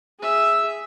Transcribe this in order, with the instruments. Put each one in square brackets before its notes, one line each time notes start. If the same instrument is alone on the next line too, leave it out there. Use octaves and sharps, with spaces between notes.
[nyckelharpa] G#4 E5